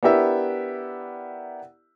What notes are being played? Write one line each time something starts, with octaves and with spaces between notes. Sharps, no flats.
B3 D4 E4 G4 A#4 E5